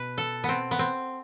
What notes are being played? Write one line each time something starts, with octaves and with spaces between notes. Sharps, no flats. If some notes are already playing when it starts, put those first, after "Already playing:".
Already playing: B2 B4
A4
B3
C4
B3
C4